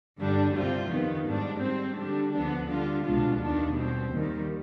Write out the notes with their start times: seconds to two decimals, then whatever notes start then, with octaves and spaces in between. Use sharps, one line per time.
0.18 G2 D3 G3 D4
0.55 C2 C3 G3 C4 F4
0.89 F2 D#3 B3
1.25 G#2 G3 D4
1.61 G#2 G3 C4
1.96 D3 G3 D4
2.32 D2 D3 F3 B3 D4
2.67 D3 G3 D4 F4
3.04 C2 B2 G#3 D4 F4
3.39 D#2 D#3 B3 D4
3.75 B2 G3 C4
4.11 D#2 D#3 G3